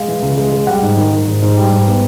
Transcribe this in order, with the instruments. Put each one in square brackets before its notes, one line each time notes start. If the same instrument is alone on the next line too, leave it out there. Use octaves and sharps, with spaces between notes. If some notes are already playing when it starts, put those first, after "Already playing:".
Already playing: [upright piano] G#3 [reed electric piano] F5
[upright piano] E3
C#2
G#3
G#3
[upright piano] G3 [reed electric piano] F#5
[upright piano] G#2
D#3
D#3
G#2
G#2
G3
G#2
B3